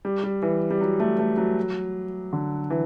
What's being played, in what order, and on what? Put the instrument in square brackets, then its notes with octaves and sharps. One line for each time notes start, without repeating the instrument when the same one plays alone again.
[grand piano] G3
G3
E3
G3
F#3
A3
A3
F#3
D3
E3